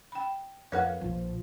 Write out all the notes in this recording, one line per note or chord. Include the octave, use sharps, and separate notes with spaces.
G5 B5
F2 C#4 A#4 B4 F5 F#5
A#1 F3 D4